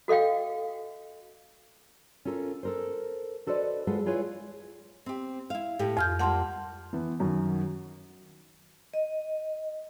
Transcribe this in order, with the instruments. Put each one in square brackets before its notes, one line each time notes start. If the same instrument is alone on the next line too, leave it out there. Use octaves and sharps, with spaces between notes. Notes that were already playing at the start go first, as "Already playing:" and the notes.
[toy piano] F#4 A4 D#5 F5 G5
[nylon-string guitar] C#4 F4 A4 A#4
A4 A#4 C5
F#4 A4 B4 C5 D5 D#5
G#3 F4 G#4 A4 B4 F#5
E4 F4 G#4 B4 C#5
C4 G4
E4 F5
A2 G4
[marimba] F2 F6 G6 [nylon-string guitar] F4
[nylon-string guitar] G3 A#3 [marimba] F#5 A5 C6
[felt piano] E3 B3
F#2 D#3 F#3
[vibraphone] D#5